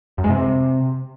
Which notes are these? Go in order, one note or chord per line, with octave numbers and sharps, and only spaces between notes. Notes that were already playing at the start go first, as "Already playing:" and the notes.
F#2
G#3
C3